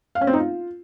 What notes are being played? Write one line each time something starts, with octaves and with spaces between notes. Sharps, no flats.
F5
C#4
C4
D#4
F4